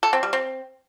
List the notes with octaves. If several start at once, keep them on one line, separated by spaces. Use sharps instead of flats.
A4
C4
G3
C4